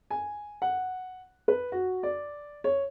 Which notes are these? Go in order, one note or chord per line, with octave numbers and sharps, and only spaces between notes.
G#5
F#5
B4
F#4
D5
C#5